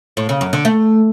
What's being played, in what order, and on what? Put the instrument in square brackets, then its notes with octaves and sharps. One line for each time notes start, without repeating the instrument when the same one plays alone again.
[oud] A2
C#3
F#2
D3
A3